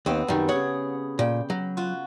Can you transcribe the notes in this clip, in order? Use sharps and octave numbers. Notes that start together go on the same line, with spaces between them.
D#2 B3 C4
F#2 D#3 G3
C#3 G#4 C#5 F#5
A#2 G5
F#3
F4 F#4